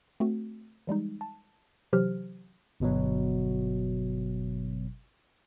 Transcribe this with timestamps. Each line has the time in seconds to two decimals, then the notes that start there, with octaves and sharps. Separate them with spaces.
0.20 A3 C4 F#4
0.87 E3 G3 G#3 D#4
1.21 A5
1.93 C3 E3 F#3 G4 C5 F6
2.80 G1 B2 F#3